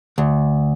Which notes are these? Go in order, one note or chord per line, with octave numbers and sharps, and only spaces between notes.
D2